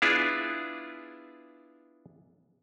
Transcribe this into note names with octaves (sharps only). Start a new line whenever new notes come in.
B3 D4 E4 F4 G#4